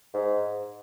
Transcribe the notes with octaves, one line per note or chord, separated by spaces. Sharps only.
G#2